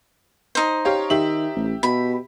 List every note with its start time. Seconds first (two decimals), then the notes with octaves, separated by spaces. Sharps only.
0.55 D#4 C5
0.85 G4 C#5 F5
1.10 D#3 G4 E5 F#7
1.55 A1
1.83 B2 B5